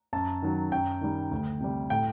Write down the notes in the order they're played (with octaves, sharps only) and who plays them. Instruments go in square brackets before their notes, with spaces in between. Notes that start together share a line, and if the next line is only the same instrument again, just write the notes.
[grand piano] F#2 A5
D#3 F#3
F#2 G5
D#3 G3
D2
C3 G3
A2 G5